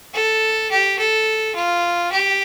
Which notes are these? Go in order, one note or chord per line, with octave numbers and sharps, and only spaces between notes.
A4
G4
A4
F4
G4